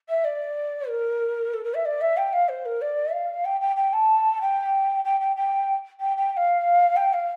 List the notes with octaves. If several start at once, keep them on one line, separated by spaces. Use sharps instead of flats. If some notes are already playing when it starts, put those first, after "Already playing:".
E5
D5
A#4
A4
A#4
E5
D5
E5
G5
F5
C5
A#4
D5
F5
G5
G5
G5
A5
G5
G5
G5
G5
G5
G5
G5
F5
G5
F5